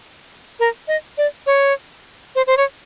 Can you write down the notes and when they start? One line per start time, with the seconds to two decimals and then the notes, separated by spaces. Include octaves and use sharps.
0.60 A#4
0.88 D#5
1.18 D5
1.47 C#5
2.35 C5
2.47 C5
2.57 C#5